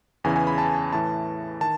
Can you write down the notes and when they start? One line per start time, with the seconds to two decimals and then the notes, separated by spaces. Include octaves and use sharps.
0.24 E2 C#3 E3 G#5
0.36 G#5
0.47 B5
0.58 A5
0.92 A2 E3 A5
1.61 D#3 A5